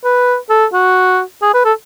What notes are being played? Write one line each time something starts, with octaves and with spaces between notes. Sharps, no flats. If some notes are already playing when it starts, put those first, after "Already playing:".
B4
A4
F#4
G#4
B4
A4